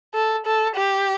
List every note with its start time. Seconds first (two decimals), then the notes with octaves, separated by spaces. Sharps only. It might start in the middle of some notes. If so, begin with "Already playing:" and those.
0.14 A4
0.46 A4
0.76 G4